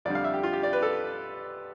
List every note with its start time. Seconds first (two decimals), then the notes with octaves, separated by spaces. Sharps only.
0.05 F2 D3 G3 D5
0.15 F5
0.24 E5
0.34 G4
0.43 F4
0.53 G4
0.63 D5
0.73 B4
0.82 A4